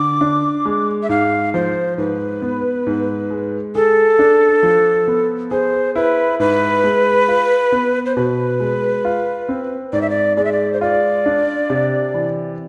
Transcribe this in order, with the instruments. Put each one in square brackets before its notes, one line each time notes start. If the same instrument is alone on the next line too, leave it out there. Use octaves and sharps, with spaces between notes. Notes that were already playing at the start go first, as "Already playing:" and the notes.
Already playing: [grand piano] D3 [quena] D6
[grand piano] D4
G#3
[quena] E5
[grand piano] G#2 [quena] F5
[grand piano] F3 [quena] C5
[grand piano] G#2 [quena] B4
[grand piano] B3
G#2
G#3
[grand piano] G#4 [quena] A4
[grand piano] D4
F3
B3
[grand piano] G#4 [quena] C5
[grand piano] E4 [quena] B4
[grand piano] G#2 [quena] B4
[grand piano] G#3
F4
B3
[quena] C5
[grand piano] B2 [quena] B4
[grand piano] G#3
F4
C4
[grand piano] G#2 [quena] D5
[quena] E5
D5
[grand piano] G#3 [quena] D5
[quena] E5
D5
C5
[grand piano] F4 [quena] D5
[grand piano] D4
C3
E3